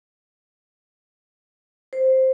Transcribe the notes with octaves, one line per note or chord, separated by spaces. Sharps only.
C5